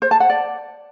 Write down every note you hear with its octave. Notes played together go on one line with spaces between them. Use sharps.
C5
A5
F#5
D5